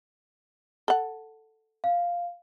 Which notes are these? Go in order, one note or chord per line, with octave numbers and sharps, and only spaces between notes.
A4 F#5
F5